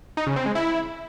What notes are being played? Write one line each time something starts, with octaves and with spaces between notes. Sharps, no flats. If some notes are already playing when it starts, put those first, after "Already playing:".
D#4
C#3
C4
G#3
E4